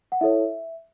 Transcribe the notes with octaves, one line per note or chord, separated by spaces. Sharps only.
F#5
E4 A4 C#5 E5